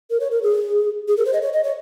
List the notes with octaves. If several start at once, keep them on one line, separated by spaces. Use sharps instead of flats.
A#4
C#5
A#4
G#4
G#4
A#4
C5
D#5
C#5
D#5
C#5